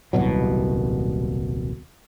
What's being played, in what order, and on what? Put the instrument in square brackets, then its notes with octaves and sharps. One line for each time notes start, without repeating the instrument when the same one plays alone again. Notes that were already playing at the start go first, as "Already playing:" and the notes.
[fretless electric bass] D#1 C2 B2 F#3